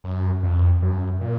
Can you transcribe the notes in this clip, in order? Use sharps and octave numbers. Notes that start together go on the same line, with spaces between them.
F#2
F2
F#2
A#2